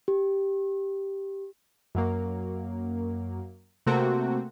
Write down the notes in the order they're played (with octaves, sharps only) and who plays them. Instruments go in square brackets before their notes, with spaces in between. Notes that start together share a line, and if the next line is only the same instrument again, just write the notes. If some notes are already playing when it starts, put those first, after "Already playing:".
[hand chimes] G4
[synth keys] F#2 F#3 A#3
C3 A3 A#3 C4 F#4